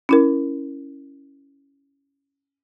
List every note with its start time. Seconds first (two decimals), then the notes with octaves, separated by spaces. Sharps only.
0.09 C#4 E4 A#4